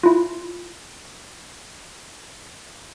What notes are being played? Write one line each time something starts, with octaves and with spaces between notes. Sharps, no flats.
E4 F4